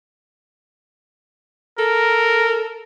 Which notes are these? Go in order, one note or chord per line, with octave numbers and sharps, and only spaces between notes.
A4 A#4